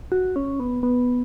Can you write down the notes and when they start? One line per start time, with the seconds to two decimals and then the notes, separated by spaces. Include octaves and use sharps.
0.12 F#4
0.36 C#4
0.60 B3
0.83 B3